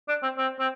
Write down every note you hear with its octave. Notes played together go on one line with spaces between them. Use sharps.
D4
C4
C4
C4